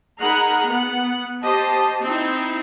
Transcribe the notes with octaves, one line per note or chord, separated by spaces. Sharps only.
D#4 G#4 A#4 F#5 A#5 B5
B3 F#5
G4 C5 D#5 A5
C4 D#4 E4